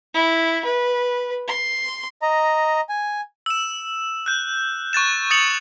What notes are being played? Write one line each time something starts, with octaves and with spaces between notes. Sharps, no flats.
E4
B4
C6
D#5 A#5
G#5
E6 E7
F#6 G6
C#6 F#6 A6 E7
D#6 A6 C#7 F7 F#7